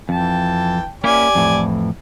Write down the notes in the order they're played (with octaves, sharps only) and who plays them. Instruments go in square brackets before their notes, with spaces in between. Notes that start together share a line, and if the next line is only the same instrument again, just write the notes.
[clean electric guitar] F2 [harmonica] E3 G5 A5
[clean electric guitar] A#3 C#4 E4 [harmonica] G4 D5 G#5
[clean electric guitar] F2 A2 E3